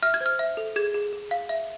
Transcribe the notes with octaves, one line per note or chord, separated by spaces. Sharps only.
E5 F6
G#6
C5
F6
E5
A4
G#4 G#6
G#4
G#4
F5
E5